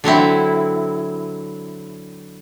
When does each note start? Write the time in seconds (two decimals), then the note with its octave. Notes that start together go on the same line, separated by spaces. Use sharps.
0.04 D3 F#3 C4 E4